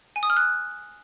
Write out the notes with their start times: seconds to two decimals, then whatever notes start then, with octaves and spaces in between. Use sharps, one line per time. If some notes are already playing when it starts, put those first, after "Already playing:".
0.16 G#5
0.23 D#6
0.30 F6
0.37 F#6